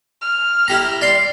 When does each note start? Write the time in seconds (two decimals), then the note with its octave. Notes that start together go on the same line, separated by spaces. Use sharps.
0.21 F6
0.68 E4 G4 A#5
1.01 D5 C6